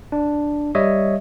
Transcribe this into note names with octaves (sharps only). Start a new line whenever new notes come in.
D4
G3 C#5 D#5 E5